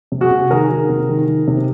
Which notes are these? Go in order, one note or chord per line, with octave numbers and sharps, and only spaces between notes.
C3
F#4 G#4
C3
D#3 G#4 A#4
D#3
C3
D#3
D#3
C3